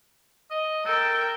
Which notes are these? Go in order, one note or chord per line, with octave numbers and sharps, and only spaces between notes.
D#5
A4 A#4 G5